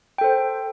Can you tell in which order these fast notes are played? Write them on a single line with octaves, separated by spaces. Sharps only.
G5 A4 C5